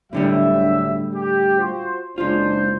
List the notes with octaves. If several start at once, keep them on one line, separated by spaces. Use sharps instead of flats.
G1 A2 D3 F#3 G3 E5
G4
F4 F#4 C5
F#1 C#2 D4 F4 C5